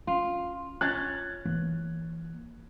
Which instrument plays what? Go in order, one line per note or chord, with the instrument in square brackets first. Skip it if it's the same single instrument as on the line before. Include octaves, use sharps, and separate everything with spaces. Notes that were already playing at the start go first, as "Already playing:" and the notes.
[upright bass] C#4 [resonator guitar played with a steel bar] F4
[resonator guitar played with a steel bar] C#4 [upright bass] F4 [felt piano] F#6 G#6 A6
[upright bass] E3 A#3